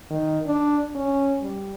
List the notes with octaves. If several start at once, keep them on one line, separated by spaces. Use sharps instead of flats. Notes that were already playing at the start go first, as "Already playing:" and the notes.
D#3
D4
C#4
G3